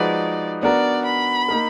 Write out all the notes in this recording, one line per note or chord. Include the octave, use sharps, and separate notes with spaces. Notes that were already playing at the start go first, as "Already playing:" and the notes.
Already playing: F3 G#3 D#4 F#4 B4 D5
B3 D4 F#4 A#4 D5
B5
A#3 D#4 A#4